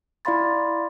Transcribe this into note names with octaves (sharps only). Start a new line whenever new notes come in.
E4 D5 F5 B5 C6 A6